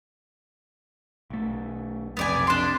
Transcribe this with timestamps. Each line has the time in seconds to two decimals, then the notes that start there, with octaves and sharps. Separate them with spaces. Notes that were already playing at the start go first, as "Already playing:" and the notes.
1.30 B1 A3
2.17 B1 F2 C3 B3 D5 G#5
2.47 D4 C6